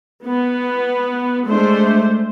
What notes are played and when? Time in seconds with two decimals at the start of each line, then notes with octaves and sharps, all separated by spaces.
0.24 B3
1.48 G#3 A3 D4 C5